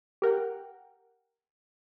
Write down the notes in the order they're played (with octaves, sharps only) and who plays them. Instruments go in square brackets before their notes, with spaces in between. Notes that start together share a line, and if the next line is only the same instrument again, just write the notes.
[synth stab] G4 A#4 F#5 G5